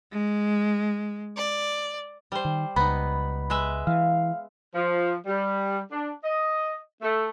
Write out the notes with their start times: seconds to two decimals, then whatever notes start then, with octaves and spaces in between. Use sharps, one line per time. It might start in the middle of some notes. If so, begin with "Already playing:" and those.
0.12 G#3
1.36 D5
2.32 G3 C5
2.45 D#3
2.76 C#2 B3 D#4 B5
3.50 G#3 B4 E5
3.87 E3 F5
4.73 F3
5.26 G3
5.91 D4
6.23 D#5
7.02 A3